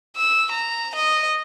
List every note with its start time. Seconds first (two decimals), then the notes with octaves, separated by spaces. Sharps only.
0.17 E6
0.51 A#5
0.95 D#5